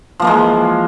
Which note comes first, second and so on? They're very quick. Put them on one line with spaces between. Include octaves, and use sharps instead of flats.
F3 A#3 E3 G#3